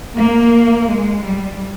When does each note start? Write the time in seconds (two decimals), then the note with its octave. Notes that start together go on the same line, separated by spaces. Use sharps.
0.15 A#3
0.87 G#3
1.23 G3